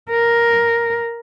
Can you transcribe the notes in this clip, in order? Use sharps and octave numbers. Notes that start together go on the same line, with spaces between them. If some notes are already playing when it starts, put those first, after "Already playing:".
A#4